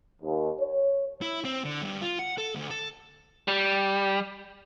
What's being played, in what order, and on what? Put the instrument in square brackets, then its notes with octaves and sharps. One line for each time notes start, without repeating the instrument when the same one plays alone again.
[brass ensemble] D#2
C#5
[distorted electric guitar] E4
C4
D3
G2
F4
F#5
A4
D2
A4
[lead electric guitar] G3